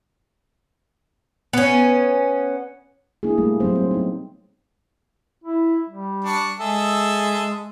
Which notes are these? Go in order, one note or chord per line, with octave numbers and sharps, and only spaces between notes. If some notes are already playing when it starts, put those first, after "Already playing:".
B3 C#4
A#3 D4 E4 G#4
G3 A3 A#3
F#3 C4 C5
C5
B3 D#4
E4
G3
D4 C#6
G#3 G#4 A4 E5